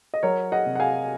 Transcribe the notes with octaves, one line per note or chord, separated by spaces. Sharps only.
D#5
F#3 A#4 C#5
D#5 F#5
C3
F#5
F5 G#5